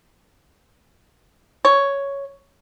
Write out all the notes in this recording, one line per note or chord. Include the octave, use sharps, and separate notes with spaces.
C#5